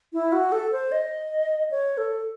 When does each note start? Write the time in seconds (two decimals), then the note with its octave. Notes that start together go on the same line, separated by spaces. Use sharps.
0.13 E4
0.32 F#4
0.52 A4
0.72 C5
0.92 D#5
1.71 C#5
1.98 A4